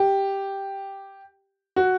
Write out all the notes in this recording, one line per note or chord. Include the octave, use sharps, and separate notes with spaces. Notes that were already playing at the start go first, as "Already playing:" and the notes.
Already playing: G4
F#4